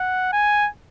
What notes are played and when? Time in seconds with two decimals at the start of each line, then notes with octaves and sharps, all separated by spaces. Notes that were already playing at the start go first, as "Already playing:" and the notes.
Already playing: F#5
0.33 G#5